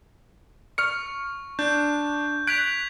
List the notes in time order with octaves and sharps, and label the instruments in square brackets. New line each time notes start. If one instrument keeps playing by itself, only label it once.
[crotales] C#6 [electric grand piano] F6 C#7
[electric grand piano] D4 [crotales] G6
[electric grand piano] F#6 D7 [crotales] G#6 B6 F7